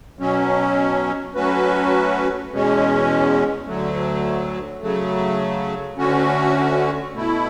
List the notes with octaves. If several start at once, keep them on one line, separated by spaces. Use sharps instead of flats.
B2 F#3 C#4
F#3 A3 C#4 F#4 B4
E2 B2 G#3 C#4
D2 D3 F#3 A3
C#3 F#3 A3
D2 D3 A3 C#4 F#4
B2 A3 E4